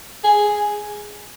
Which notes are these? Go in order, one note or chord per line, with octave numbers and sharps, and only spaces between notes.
G#4